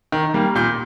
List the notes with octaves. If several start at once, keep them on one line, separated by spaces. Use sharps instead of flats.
D#3
G3 A#3
A#2 G6